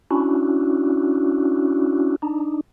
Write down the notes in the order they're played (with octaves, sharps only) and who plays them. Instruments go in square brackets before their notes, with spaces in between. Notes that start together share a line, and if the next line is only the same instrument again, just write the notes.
[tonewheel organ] C#4 D4 E4 F#4
D4 D#4